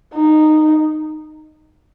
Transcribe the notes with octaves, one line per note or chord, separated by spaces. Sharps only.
D#4